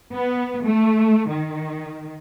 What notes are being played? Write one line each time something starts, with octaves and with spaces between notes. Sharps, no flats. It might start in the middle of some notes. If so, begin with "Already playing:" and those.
B3
A3
D#3